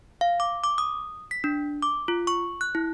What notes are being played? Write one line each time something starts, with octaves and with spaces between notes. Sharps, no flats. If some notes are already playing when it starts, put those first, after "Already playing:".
F5
D6
D6
D#6
B6
D4
D6
F4
C#6
F#6
E4